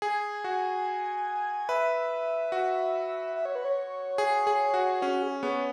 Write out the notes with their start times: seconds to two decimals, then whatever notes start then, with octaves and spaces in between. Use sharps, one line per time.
0.02 G#4 G#5
0.44 F#4
1.69 B4 E5
2.52 F#4
3.35 E5
3.45 C#5
3.55 B4
3.65 C#5
4.18 G#4
4.47 G#4
4.74 F#4
5.02 C#4 F#4
5.22 G#4
5.43 B3 C#5